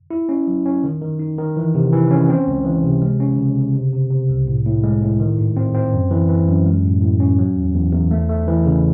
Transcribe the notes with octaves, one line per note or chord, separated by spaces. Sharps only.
E4
C#4
F#3
C#4
D#3
D#3
D#4
D#3
E3
C3
E3
C#4
C4
C#2
E3
C3
G#3
C#4
C#3
C#3
C3
C3
C3
C2
A2
A2
G#3
A2
D#3
G#2
C4
C4
F#2
E3
E3
F#2
G#3
A2
A2
C#4
F#3
E2
E2
E2
A3
A3
E3
C#3